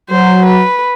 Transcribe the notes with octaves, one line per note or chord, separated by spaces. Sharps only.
F#3 C5
B4